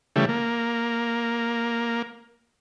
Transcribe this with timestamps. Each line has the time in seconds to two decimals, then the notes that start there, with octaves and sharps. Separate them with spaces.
0.16 C#3 E3 G3 A3
0.29 A#3